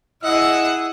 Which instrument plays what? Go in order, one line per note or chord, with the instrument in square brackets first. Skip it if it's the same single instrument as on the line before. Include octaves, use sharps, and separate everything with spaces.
[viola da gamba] E4 [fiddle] G#4 F#5 [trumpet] D#5 [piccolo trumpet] E6